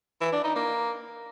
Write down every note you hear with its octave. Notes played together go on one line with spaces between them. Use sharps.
E3
D4
D#4
A#3